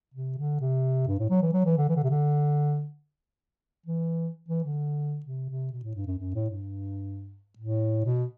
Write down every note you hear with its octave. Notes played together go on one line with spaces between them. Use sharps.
C3
D3
C3
G2
A2
F#3
E3
F#3
E3
D3
E3
D3
C3
D3
E3
E3
D3
C3
C3
B2
A2
G2
F#2
F#2
A2
G2
A2
B2